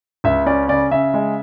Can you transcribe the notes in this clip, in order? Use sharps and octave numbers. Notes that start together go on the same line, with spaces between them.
C#2 E5
C#4 D5
C#3 D5
C#3 E5
G#3